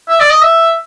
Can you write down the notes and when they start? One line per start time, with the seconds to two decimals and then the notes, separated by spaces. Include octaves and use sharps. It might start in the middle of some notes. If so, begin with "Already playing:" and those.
0.09 E5
0.20 D5
0.30 D#5
0.42 E5